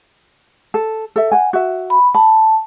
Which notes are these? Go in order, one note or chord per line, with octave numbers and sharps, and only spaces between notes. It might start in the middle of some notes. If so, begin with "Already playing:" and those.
A4
A4 E5
F#5 G#5
F#4 E5
B5
A5 B5